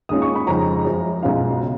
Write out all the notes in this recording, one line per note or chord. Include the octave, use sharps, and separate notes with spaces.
D#2 D#3 G#3 C#4 F4 D#6
C#6
B5
F2 C#3 G#3 D#4 A#5
F#2 F3 G#3
B1 B2 G#3 C#4 F4 F5
C#3